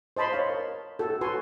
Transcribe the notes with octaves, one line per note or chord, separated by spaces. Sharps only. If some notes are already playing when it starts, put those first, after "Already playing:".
C5 D#5 A5 B5 C6
C#5 F5
A#4
F#4 A4
F#4 B4 G#5 A5 C6 C#6